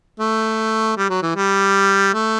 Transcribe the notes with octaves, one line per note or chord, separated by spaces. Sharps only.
A3
G3
F#3
E3
G3
A3